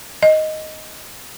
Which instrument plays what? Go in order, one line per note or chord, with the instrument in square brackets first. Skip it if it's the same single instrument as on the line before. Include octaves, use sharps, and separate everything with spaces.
[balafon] D#5